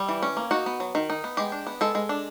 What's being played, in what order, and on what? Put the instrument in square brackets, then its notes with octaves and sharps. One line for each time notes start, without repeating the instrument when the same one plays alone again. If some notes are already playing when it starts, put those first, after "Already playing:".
Already playing: [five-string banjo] G3
E3
C#4
A#3
D#4 F#4
B3
F#3
D#3
D#4
B3
G#3 G4
D4
B3
G#3 A4
G#3
D4